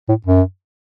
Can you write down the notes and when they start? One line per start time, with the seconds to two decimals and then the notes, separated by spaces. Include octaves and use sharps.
0.09 A2
0.26 F#2